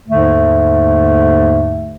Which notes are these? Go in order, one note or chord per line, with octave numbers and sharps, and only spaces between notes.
D#2 G#2 D3 A3